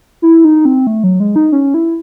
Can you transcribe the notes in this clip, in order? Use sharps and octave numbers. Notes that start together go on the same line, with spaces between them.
E4
D#4
C4
A3
F#3
G#3
D#4
C#4
E4